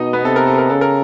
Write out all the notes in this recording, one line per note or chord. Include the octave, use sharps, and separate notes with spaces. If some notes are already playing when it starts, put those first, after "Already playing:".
Already playing: B2 D#4 D#5
B3 B4
C3 A4
A#4
A4
A#4
C#3 A4
A#4